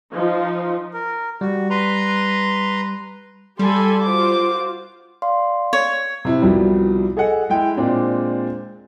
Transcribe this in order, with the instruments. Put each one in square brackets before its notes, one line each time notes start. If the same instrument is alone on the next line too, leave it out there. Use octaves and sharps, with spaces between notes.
[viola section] F3 D#4
[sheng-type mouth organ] A#4
[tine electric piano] G3 [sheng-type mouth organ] F#4
[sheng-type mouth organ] B4 A#5 C6
[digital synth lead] G3 [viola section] G4 A4 G#5 [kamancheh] B5 C6
[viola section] F4 F#4 [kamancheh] C5 D6
[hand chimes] D5 F5 C6
[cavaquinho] C#5
[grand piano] C3 E4
C2 B2 F3 G3
G#4 A4 D#5 F#5
G#3 E4 G5
A#2 G#3 C4 D4